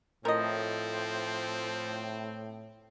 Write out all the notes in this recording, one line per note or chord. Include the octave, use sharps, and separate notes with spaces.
A2 F3 C4 A#4 D#5